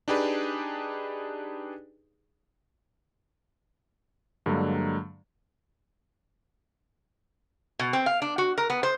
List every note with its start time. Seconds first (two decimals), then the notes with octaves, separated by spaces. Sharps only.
0.08 D4 D#4 G4 G#4 B4 D5
4.46 G2 D3 F#3 G#3 A#3 A#5
7.79 B2
7.93 C4
8.06 F5
8.22 D4
8.38 F#4
8.58 A#4
8.70 B3
8.83 C5